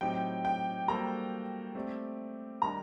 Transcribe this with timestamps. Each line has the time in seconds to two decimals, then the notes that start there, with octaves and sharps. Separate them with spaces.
0.01 A2 F#3 C4 D#4 G4 G5
0.45 G5
0.88 G3 A#3 F#4 A4 C5 A#5
1.75 A3 C4 G4 D5
2.62 D#3 G3 D4 A#5